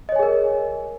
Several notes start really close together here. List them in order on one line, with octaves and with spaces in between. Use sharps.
D#5 C#5 G#5 G#4 A#4